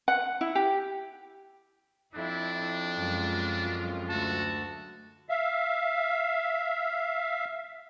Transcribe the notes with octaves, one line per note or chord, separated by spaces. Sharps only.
F#5
E4
G4
F2 D4 E4
F#2 G#3 F4
D2 F#4 A5
E5 F5